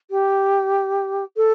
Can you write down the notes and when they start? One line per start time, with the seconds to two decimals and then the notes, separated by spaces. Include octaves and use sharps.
0.10 G4
1.37 A4